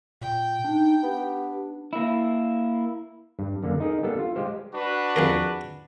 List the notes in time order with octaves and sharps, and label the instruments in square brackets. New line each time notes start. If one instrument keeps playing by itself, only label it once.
[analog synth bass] A#2 [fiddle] G5
[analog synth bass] D4 [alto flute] D#4
[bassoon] B3 [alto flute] G4
[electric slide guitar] A#3 E4
[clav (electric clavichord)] G2
F#2 D3 A#3
D#4 G#4 A#4
G3 A#3 B3 D4 G4 A4
F4
G#3 G4 C5 F5
[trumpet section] D4 F#4 B4
[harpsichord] F2 G#4 A#4